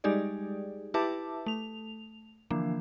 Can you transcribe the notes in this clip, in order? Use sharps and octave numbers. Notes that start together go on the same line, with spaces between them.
G3 G#3 D#4 G4 G#4 D5
E4 G4 B4 E5 A5 D6
A3 F7
D3 E3 F3 A#3 D4